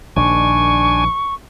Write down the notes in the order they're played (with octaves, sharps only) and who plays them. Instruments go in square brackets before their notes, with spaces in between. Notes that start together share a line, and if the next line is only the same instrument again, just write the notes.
[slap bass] A#1 D#3 [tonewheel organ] D4 G#5 [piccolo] C#6